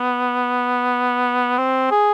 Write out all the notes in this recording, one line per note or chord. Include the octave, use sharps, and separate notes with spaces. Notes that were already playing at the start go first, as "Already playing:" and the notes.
Already playing: B3
C4
G#4